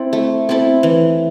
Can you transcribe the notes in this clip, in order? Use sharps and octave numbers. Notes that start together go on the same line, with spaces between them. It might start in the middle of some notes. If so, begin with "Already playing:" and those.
Already playing: C4 E4 A4
A3
C4 E4 A4
E3